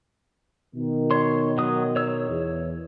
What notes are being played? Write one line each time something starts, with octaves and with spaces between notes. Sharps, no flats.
B2 D#3
C#5 C6
F#3 D#6
C#5 E6
E2